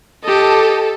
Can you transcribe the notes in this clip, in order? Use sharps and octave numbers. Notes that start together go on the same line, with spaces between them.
G4 A4 D#5